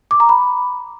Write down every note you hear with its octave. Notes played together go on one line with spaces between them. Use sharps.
D6
A#5
B5